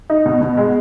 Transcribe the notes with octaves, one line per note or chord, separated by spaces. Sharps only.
D#4
B2
B2
G#3